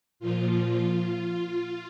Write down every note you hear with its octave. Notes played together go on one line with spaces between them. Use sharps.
A#2 F3 F4